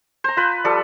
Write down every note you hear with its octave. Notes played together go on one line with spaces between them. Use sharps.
C5 A#5
F4 B4
F3 G3 A4